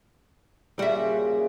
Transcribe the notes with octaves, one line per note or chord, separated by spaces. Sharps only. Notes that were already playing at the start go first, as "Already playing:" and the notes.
A#2 C#3 G3 F#4 E5